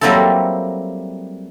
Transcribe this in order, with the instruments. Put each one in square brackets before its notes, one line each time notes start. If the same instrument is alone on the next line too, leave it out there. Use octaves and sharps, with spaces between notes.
[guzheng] F#3 G3 A#3 C4 E4 A4